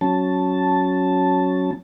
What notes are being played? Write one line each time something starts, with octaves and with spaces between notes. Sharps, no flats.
F#3 C#4 A5